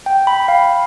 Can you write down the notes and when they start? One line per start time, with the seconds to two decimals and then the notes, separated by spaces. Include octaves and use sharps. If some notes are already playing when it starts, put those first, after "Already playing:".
0.06 G5
0.27 B5
0.48 F5